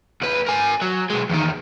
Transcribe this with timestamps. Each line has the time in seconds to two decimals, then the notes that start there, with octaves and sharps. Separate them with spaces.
0.22 D#2 B4
0.47 A#4 G#5
0.82 F#3
1.10 B1 G#3
1.30 E2 D#3